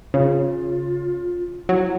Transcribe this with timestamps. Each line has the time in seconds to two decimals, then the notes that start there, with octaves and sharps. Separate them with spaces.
0.14 C#3 F4
1.69 F#3 E4